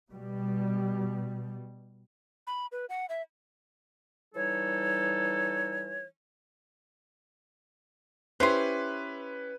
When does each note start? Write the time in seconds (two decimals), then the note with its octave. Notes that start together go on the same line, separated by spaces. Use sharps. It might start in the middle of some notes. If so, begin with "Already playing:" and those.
0.10 B2 G3
2.47 B5
2.72 B4
2.89 F#5
3.09 E5
4.35 E3 G3 D#4 A4 C#5
8.40 C#4 E4 G4 B4 C5 C6